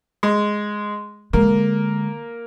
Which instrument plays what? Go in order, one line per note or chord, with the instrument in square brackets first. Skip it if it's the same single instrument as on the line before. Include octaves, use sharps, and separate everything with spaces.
[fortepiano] G#3
[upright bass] D3 G#3 [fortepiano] A#3